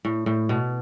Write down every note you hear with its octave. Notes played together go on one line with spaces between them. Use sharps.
A2
A2
B2